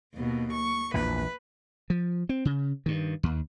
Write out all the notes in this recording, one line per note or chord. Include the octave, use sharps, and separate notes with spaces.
D#2 B2
C#6
A#1 E2 B4
F3
C4
C#3
G2 D#3
D#2